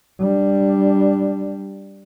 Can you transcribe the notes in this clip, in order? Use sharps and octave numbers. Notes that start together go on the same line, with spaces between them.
G3 D4